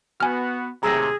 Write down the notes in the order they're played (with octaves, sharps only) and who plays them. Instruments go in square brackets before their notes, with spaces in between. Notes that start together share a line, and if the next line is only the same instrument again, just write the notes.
[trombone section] B3 F#4 [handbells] G#5 F6
[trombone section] D#2 A2 C3 [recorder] G#4 [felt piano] A#5 E6 A#6